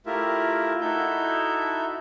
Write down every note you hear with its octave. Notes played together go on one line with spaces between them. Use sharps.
A3 E4 F4 G4 A#4 E5
D#4 E4 F#4 A4 E5 G6